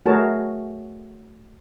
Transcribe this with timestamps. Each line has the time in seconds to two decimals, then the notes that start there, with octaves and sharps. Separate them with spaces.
0.06 A3 F#4 G#4 A#4 C#5 A5